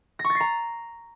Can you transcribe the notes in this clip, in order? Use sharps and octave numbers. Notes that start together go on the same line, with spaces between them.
A#6
C#6
A6
C7
A#5